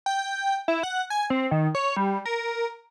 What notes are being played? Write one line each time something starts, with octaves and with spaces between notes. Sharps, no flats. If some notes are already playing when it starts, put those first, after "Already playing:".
G5
E4
F#5
G#5
C4
D#3
C#5
G3
A#4